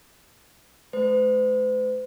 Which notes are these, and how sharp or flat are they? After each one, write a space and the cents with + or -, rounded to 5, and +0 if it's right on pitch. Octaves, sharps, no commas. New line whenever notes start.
A3 -45 C5 -45